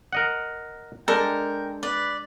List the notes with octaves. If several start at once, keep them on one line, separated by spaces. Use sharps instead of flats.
A#4 D#5 F#5
G#3 D4 A4 A#4 G5
B4 D5